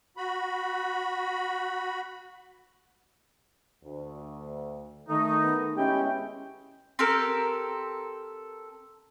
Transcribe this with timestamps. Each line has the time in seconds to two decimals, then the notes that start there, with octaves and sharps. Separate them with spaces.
0.17 F#4 B5
3.84 D2
5.09 D#3 A3 D#4
5.42 A3 B3
5.77 B2 G#3 C#4 E4 G4 G5
6.99 C4 G4 A4 A#4